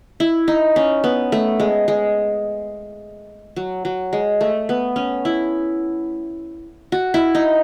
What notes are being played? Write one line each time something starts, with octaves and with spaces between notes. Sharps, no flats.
E4
D#4
C#4
B3
A3
G#3
G#3
F#3
F#3
G#3
A3
B3
C#4
E4
F#4
E4
D#4